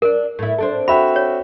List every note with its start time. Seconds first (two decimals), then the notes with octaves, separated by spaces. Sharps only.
0.02 D4 A#4 D5
0.39 A2 E4
0.58 C4 D4 A4
0.88 F#4 E5 G5 B5
1.16 C#5